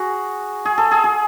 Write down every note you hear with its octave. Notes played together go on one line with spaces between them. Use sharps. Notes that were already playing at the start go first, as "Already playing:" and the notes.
Already playing: F#4 G#4
G#4
A4
G#4
G#4